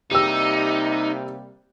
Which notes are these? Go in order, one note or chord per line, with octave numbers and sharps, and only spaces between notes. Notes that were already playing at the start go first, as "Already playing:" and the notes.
C3 G3 A#3 D#4 G4 E6